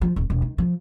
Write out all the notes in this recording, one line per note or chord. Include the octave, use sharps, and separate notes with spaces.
F3
D#1
E1
D#3
F3